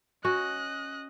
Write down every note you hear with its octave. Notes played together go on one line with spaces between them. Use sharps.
C#4 F#4 D#5 F#6